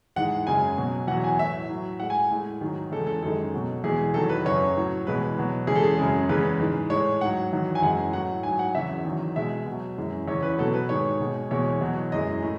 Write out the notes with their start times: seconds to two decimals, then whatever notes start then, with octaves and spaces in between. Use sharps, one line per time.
0.16 G#2 E3 G#3 F#5
0.47 F#2 C#3 G#3 G#5
0.77 B2 F#3
1.07 E2 B2 F#3 F#5
1.24 G#5
1.38 A2 F#3 E5
1.69 A2 F#3
1.99 A2 G#3 F#5
2.10 G#5
2.30 A2 G#3
2.61 G#2 D#3 F#3
2.91 E2 C#3 G#3 A4
3.07 A4
3.23 F#2 D#3 G#3 A4
3.53 B2 F#3
3.84 E2 B2 G#3 G#4
4.14 E2 D#3 F#3 A4
4.29 B4
4.45 F#2 C#3 F#3 C#5
4.76 A2 F#3
5.07 E2 B2 G#3 B4
5.38 B2 F#3
5.67 E2 C#3 G#3 G#4
5.75 A4
5.84 G#4
5.98 F#2 C#3 G#3
6.29 E2 C#3 E3 G#3 B4
6.60 G#2 E3 G#3
6.90 A2 G#3 C#5
7.21 G#2 F#3 F#5
7.52 E2 D#3 F#3
7.75 G#5
7.82 F#2 E3 G#3 F#5
8.13 A2 F#3 F#5
8.43 G#2 F#3 G#5
8.59 F#5
8.75 E2 C#3 F#3 E5
9.05 E2 D#3 F#3
9.36 B2 G#3 E5
9.66 B2
9.71 F#3
9.97 F#2 E3 G#3
10.28 E2 C#3 E3 C#5
10.43 B4
10.58 B2 F#3 A4
10.74 B4
10.89 G#2 D#3 G#3 C#5
11.20 B2 G#3
11.51 E2 B2 G#3 C#5
11.81 E2 B2 F#3
12.12 F#2 E3 G#3 D#5
12.42 A2